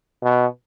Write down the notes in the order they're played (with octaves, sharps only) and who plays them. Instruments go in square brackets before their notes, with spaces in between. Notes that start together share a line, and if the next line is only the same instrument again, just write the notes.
[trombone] B2